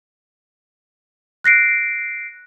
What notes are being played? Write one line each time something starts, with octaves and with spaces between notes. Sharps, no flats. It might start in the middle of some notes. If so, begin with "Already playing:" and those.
F#6 A#6 C7 D7